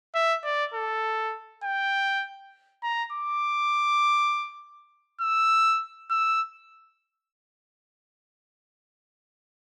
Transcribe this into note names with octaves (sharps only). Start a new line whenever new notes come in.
E5
D5
A4
G5
A#5
D6
E6
E6